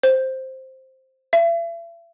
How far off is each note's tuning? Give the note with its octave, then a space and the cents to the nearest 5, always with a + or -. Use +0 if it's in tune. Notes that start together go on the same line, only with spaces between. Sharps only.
C5 +5
E5 +40